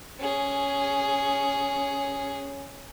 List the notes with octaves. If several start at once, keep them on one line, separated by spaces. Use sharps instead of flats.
C#4 G#4